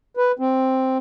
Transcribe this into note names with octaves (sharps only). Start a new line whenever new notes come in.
B4
C4